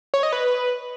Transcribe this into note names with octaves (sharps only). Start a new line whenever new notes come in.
C#5
D#5
B4